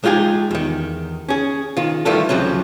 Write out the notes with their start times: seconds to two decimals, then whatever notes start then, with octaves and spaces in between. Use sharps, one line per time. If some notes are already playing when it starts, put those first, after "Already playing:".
0.04 G#3 D#4 F4 G4 G#4
0.51 E2 D#3
1.29 C#4 G#4
1.77 D#3 F4
2.05 D#3 E3 G3 A3 F4 A4
2.29 D2 C#3 F3 F#3 C4